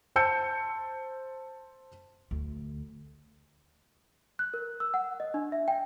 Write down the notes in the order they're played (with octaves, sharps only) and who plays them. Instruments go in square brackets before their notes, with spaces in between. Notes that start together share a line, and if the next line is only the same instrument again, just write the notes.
[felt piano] C5 A5 E6 G6 C#7
[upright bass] D2
[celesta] F#6
A#4
E6
F#5
D#5
D4
E5
G5